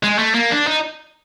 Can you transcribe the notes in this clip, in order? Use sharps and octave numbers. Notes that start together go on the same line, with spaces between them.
G#3
A3
A#3
D4
D#4